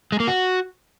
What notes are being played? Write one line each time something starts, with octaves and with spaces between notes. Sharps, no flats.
G#3
A#3
F#4